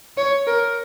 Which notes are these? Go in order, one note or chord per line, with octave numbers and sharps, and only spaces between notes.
C#5
A#4